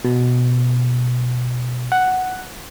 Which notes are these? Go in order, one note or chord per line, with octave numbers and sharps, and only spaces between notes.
B2
F#5